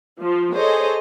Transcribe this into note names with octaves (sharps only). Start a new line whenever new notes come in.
F3 F4
G#4 A4 C5 C#5 D#5